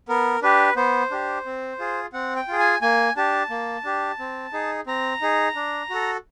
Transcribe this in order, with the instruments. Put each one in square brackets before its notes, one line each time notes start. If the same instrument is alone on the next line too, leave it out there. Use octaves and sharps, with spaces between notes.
[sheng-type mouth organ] B3 A#4
D4 G4 B4
B3 C5
D4 G4
C4
F4 G#4
C4 F#5
G5
F4 G#4
G#5
A#3 G#5
D4 G4 A5
A#3
D4 G4
C4
D#4 G#4
C4 A#5
D#4 G#4
D4
F#4 A4